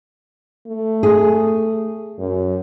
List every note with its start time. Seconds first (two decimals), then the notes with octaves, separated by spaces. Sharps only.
0.67 A3
1.03 G#4
2.19 F#2